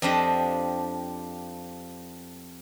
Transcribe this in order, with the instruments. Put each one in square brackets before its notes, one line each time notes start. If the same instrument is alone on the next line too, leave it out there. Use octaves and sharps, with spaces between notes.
[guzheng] F2 F3 D4 G4 D#5